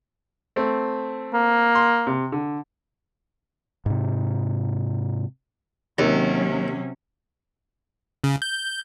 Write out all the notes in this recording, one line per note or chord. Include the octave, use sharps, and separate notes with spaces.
A3 C4
A#3
C6
C3
D3
G#2 C3
D#2 C3 F#3 C#4
C#3
G6